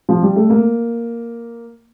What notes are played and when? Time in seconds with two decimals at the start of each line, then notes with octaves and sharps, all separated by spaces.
0.09 F3
0.22 G3
0.36 A3
0.50 A#3